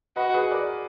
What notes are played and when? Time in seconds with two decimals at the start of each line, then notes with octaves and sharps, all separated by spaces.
0.16 F#4 B4 D#5
0.34 G#4 B4
0.51 A#4 D5